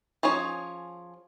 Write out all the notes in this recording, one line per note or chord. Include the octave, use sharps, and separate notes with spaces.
F3 C#4 G#4 C#5